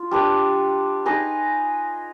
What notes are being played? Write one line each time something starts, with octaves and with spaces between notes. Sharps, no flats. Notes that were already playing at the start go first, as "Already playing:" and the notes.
Already playing: F4
G3 D4 G4 B4
D#4 G#4 B4